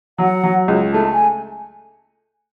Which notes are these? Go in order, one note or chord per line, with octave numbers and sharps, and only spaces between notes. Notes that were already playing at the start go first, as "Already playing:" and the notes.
F#3 F#5
F#3
C#2
A3 A5
G#5